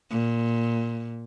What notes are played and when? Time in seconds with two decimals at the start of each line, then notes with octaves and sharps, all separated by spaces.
0.11 A#2